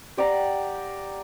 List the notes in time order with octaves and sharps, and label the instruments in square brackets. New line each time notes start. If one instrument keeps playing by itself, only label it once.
[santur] G4 D5 F#5 A#5